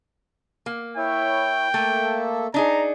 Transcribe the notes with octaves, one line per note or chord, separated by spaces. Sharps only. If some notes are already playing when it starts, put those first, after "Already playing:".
A#3
E4 C#5 E5 G5
A3 A#3 A4 E5
D4 D#4 G#4 A#5